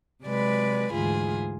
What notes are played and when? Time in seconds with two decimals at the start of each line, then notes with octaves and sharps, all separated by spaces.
0.24 C3 F#3 G#3 B4 D5 B5
0.92 D2 G#2 E3 F4 G#4